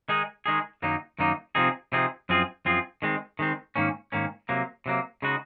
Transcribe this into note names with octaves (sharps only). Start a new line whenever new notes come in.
D#3 G#3 D#4 G#4
D#3 G#3 D#4 G#4
F#2 D#3 F#3 A#3 D#4
F#2 D#3 F#3 A#3 D#4
C3 F3 C4 D#4 G#4
C3 F3 C4 D#4 G#4
F#2 F3 C4 F4 G#4
F#2 F3 C4 F4 G#4
D#3 G#3 C4
D#3 G#3 C4
G#2 D#3 A#3 C#4
G#2 D#3 A#3 C#4
C3 F#3 A#3
C3 F#3 A#3
C#3 G#3 D#4 F#4